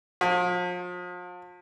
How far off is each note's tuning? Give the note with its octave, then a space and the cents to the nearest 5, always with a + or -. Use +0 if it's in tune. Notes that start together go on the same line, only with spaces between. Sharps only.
F3 +35